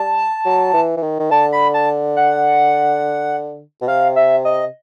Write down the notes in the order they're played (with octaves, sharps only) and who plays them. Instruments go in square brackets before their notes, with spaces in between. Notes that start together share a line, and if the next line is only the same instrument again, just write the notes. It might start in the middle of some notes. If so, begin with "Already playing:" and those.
Already playing: [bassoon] G3 [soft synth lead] A5
[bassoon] F#3
E3
E3
D#3
D#3
[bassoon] D3 [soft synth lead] A5
[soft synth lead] B5
A5
F#5
[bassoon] B2
[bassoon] C3 [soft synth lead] F5
[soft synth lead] E5
D#5